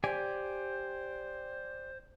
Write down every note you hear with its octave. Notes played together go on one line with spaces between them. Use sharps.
G4 C5 D5 G#5